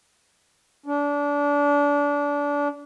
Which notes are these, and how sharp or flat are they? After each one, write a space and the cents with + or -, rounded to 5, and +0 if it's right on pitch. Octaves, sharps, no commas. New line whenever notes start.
D4 -25